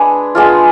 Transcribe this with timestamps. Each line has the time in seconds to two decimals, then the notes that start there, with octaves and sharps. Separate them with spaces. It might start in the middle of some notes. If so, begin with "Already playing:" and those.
Already playing: G#3 D4 G#4 B4
0.35 G#3 B3 D4 F4